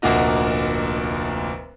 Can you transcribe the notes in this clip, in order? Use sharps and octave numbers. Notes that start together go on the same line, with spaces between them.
F1 D2 A#2 A#3 F#4 D#5